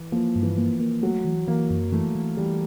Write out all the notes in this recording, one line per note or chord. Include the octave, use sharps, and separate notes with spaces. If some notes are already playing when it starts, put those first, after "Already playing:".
Already playing: E3
F3 A#3
G2
E3
A#3
A#3
F#3 A3
E3
E3 A#3
F#2
E3 A3
E3
E3 G3